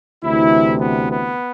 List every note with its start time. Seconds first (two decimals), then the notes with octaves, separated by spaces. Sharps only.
0.23 D2 C3 E3 E4
0.80 B3
1.10 B3